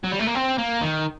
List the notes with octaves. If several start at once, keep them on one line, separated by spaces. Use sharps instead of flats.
F#3
G3
A3
A#3
C4
A#3
D#3